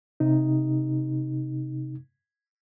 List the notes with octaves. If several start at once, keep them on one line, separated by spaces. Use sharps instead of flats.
C3 D#4